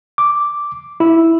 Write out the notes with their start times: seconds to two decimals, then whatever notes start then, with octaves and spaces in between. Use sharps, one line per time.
0.18 D6
1.00 E4